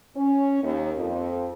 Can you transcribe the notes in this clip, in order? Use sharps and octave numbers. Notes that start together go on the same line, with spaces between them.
C#4
D#2
F2